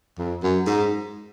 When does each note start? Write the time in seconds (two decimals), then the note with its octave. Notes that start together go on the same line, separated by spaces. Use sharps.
0.18 F2
0.43 F#2
0.67 G#2